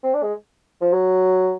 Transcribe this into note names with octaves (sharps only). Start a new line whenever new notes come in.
C4
D4
G#3
F3
F#3